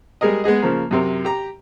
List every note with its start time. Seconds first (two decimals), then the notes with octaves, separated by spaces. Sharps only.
0.21 G3 G#3 G#4 A#4 D#5
0.44 G#3 B3 G#4 D#5
0.62 C#3 F3 A#3
0.91 F#2 C3 A#4
1.25 G4 A#5